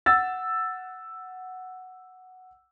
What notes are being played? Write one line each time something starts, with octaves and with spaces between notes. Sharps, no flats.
F#5 E6 A6